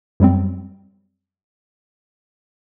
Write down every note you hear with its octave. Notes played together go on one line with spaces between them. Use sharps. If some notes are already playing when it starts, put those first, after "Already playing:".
F#2 F#3 G3 C4